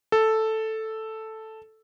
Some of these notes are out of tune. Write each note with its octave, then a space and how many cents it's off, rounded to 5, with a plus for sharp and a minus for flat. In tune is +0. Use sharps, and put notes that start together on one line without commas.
A4 +0